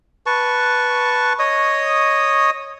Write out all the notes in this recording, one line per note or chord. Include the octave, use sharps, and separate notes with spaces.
B4 A5 C#6
C#5 D#5 D#6